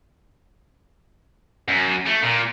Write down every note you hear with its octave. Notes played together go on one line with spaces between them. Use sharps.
F#2
A3
A#2